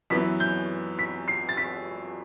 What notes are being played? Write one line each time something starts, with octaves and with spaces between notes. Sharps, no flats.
F#2 E3 B3 B6
G6
B6
C7
A6
B6